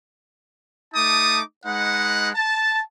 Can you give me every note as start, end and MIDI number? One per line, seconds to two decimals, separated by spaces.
0.94 1.41 57
0.94 1.41 63
0.94 1.41 81
0.94 1.41 86
0.94 1.41 87
1.66 2.30 56
1.66 2.30 63
1.66 2.30 71
1.66 2.30 78
2.35 2.80 81